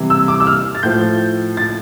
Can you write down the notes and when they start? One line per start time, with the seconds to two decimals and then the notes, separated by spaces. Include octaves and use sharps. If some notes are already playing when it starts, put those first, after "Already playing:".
Already playing: C3 E3 G3
0.10 E6
0.28 D6
0.40 E6
0.47 F6
0.75 A6
0.83 A2 F3 G6
1.57 A6